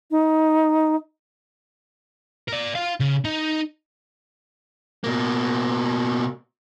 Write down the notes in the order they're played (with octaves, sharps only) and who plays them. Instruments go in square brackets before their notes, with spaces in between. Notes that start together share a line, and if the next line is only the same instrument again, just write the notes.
[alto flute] D#4
[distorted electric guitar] A#4 D5
F4 F5
C#3
D#4
[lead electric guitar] B2 A#3